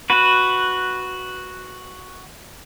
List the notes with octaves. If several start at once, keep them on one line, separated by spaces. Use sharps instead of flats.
F#4 B4